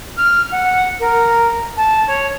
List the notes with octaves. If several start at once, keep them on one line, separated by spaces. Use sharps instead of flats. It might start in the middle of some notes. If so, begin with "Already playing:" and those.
F6
F#5
A#4
A5
C#5